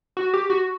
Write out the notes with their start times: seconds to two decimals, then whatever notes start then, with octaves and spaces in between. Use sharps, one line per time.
0.17 F#4
0.34 G4
0.50 F#4